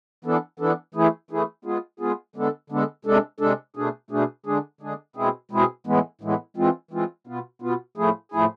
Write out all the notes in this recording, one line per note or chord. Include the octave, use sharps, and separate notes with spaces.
E3 B3 D4 A4
E3 B3 D4 A4
E3 A3 E4 G#4
E3 A3 E4 G#4
G#3 B3 F4 G#4
G#3 B3 F4 G#4
D3 G#3 B3 D4 A4
D3 G#3 B3 D4 A4
C3 G#3 D4 A4
C3 G#3 D4 A4
B2 A3 D4 G#4
B2 A3 D4 G#4
D3 G#3 D4 G#4
D3 G#3 D4 G#4
B2 G#3 C4 E4 G#4
B2 G#3 C4 E4 G#4
A2 E3 G#3 B3
A2 E3 G#3 B3
E3 G#3 C4 F4
E3 G#3 C4 F4
B2 B3 F4
B2 B3 F4
A2 F3 A3 E4 G#4
A2 F3 A3 E4 G#4